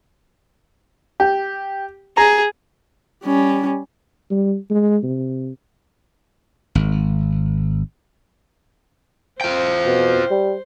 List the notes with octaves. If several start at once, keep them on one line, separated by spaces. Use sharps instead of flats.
G4
G#4 A#5
G3 C#4
G3
G#3
C3
G#1
F4 C5 G5
B2
G3